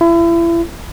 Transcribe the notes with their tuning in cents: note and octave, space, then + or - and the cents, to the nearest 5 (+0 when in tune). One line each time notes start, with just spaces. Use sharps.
E4 +35